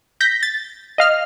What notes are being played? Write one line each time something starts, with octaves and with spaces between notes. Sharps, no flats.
G6 A#6 B6
A6
D#5 F5 F6